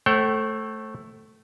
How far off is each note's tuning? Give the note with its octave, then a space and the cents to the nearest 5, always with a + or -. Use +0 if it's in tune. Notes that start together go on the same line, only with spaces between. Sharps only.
A3 +0 C5 +35 G5 -45